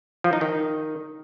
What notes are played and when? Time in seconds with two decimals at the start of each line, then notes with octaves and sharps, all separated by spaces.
0.24 F3
0.33 D#4
0.41 D#3